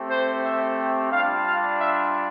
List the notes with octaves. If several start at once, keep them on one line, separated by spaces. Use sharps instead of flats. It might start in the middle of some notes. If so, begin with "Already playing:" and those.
Already playing: A3 C4 G4
C5
E5
G3 D4 F4 F5
F5
E5